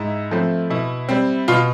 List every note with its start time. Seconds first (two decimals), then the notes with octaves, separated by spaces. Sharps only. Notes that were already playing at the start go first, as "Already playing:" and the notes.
Already playing: G#2 E4
0.31 F3 A3 C4
0.70 B2 E4
1.09 G3 C4
1.48 B2 F4